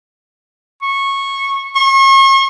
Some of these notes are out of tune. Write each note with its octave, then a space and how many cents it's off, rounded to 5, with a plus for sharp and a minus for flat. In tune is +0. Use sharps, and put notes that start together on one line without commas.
C#6 -15
C#6 -40